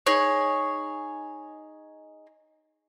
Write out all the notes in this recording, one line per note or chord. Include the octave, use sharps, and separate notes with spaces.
D#4 G#4 C#5